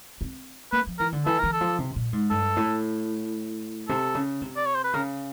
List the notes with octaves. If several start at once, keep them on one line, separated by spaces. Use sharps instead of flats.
C4
A#3 B4
F3
E3 A#4
D3
E3 A4
E3 A#4
A4
F3
C3
A#2
G#2
G2 A4
A2
C3 A4
C#3
C3
D5
C#5
C5
B4
C#3 A#4